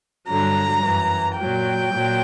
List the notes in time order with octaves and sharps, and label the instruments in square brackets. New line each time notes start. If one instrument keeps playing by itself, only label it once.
[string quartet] G2 D3 F#3 A#5
F#2 E3
A#2 F#3 G5
A#2 F#3